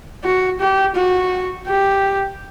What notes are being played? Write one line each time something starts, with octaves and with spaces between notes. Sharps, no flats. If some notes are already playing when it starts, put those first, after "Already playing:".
F#4
G4
F#4
G4